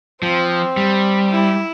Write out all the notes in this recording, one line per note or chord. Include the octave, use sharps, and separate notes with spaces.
F3 C4
G3
E4